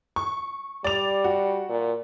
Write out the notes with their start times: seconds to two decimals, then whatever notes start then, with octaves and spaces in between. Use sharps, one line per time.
0.16 C#6
0.84 G3 D5 F7
1.24 F#4
1.69 A#2